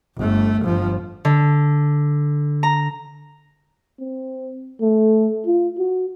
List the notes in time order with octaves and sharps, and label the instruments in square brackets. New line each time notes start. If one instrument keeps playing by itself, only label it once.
[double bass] G1 A3
G1 F3
[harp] D3
A#5
[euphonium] C4
A3
F4
F#4